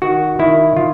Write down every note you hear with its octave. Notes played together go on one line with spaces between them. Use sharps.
D#3 F#4
D#3 E4
D#3 F4